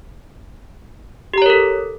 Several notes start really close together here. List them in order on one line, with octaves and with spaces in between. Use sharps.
G4 A#5 C#5 A#4 A4